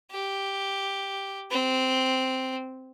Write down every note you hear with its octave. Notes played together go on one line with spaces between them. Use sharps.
G4
C4